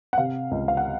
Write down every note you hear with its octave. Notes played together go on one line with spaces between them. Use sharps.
F#5
C3 F5
C#2
F5
F#5